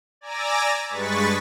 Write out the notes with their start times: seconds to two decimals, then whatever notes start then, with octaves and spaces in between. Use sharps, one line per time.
0.21 D5 G#5 A#5 D6 E6 A#6
0.89 G2 G#3 B4 C#6 A6 B6